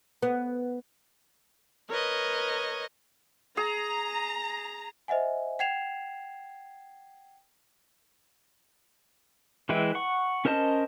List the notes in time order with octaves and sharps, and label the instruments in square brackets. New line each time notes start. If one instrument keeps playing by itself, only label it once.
[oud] B3
[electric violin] A#4 B4 [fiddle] C#5 D#5
[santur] G#4 [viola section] A#5
[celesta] C5 D#5 E5 F#5 G#5
F#5 G5 G#6 C7 E7 F7
[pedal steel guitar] E3 G#3 E4 B4 G5
F#5 C#6
C#4 A#4 C5 D#5 A5